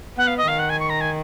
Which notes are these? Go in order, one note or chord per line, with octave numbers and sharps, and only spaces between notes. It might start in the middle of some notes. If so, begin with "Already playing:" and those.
B3 F#5
F5
D#5
D#3 F5
F#5
G#5
C#6
A#5
G#5